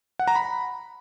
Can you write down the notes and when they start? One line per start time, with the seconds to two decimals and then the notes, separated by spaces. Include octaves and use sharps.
0.19 F#5
0.28 A#5
0.36 B5